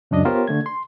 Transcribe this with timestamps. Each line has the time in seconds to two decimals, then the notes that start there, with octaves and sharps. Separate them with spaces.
0.11 C#2 F#2 D4 D#5
0.25 B3 F4 G4 A#4 C5 C#5
0.48 D3 A3 G#6
0.66 C6